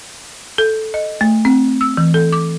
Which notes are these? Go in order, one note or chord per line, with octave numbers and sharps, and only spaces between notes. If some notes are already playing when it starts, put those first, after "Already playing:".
A4
D#5
A3
C4
E6
E3
A4
D6